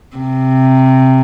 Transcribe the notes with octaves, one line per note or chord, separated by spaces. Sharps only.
C3